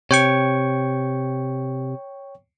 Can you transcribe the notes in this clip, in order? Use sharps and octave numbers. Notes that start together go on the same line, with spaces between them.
C3 C#5 G5 C#6